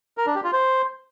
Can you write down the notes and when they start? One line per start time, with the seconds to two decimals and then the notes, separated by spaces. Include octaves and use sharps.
0.17 A#4
0.26 D4
0.35 G4
0.44 F4
0.53 C5